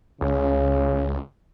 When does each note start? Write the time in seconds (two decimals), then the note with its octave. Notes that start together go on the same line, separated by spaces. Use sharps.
0.21 C#2 C#3